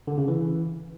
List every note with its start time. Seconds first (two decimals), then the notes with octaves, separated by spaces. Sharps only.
0.07 D3
0.18 C#3
0.28 E3